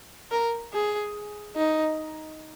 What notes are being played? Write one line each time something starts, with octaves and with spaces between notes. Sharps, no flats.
A#4
G#4
D#4